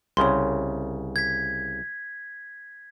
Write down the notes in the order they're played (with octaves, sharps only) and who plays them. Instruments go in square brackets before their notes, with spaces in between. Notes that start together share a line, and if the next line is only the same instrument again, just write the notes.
[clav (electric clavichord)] C2 C#3 [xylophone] C#5 C6
[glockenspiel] G#6 B6